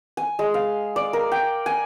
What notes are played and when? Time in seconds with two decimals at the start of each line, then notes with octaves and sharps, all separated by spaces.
0.17 G#5
0.39 G#3
0.54 F5
0.96 D5
1.13 A#4
1.32 G5
1.66 G#5